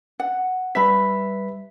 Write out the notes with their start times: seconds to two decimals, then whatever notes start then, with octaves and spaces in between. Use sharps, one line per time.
0.20 F#5
0.75 G3 B4 E5 B5 B6